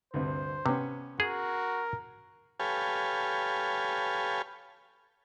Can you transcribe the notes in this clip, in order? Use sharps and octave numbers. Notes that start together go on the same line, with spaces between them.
D2 G2 C3 C5
C3 B3 C#4
F#4 G#4 A#4
G4 A4 B4 C#5 F5 G#5